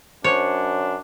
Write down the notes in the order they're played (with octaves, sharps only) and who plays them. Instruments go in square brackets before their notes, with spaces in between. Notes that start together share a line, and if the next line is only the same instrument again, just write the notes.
[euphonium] F#2 [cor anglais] D4 [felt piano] C5 [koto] C#5